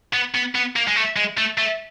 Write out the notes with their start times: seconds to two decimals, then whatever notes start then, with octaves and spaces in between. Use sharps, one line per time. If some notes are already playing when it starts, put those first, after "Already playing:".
0.13 B3
0.35 B3
0.55 B3
0.76 A#3
0.88 G#3
0.96 A3
1.16 G#3
1.38 A3
1.58 A3